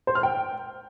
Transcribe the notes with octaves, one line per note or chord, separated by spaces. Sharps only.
C5
F6
G5